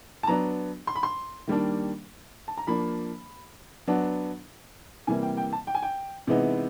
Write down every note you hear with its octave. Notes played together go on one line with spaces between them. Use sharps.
A5
F#3 B3 D4 A#5
C6
B5
C6
D#3 G3 A#3 D4
A5
A#5
F3 A#3 D4 B5
F#3 B3 D4
C3 E3 G3 A#3 G#5
G5
G5
A5
G5
G#5
G5
C3 E3 G#3 B3 D#4